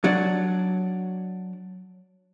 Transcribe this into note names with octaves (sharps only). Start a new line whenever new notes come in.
F#3 D4